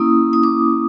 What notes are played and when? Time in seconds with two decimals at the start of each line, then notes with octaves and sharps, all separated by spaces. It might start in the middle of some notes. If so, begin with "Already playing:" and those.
Already playing: A#3 C#4 E4 D#6
0.33 D#6
0.43 D6